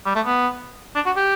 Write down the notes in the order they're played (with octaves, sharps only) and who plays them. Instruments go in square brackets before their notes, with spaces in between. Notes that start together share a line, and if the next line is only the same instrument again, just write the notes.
[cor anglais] G3
A3
B3
D4
F#4
G4